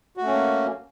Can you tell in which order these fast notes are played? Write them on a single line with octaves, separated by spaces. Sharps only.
F#4 A3 C#4 A#3